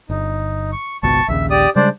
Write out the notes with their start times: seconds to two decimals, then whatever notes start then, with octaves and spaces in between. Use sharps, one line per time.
0.10 G1 D#4
0.72 C#6
1.03 G#1 C#2 B2 A5 C#6
1.28 A#1 D#2 C#3 E5
1.50 G4 D5 D#6
1.76 C#3 G3 G#3 D4 C5 D5